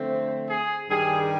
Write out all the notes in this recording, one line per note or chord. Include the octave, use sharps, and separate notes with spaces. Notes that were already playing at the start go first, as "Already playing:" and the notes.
Already playing: D3 F3 A3 C4
G#4
G2 D#3 G3 G#4